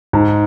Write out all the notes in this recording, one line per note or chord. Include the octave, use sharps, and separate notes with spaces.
G#2